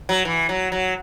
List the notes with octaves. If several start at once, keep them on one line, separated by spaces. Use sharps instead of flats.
F#3
E3
F#3
F#3